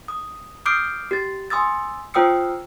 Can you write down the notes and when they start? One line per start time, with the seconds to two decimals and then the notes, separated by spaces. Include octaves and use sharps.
0.08 D#6
0.66 D6 D#6 F6 G6 C7 D7
1.11 G4 A6
1.50 G#5 C6 D#6 E6 A6
2.14 F4 C5 G5 D#6 E6 C#7